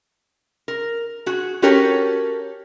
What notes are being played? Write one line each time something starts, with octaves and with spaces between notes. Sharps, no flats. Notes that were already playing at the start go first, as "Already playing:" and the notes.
A#4
F#4 G#4
C#4 F#4 G4 A4 A#4 C#5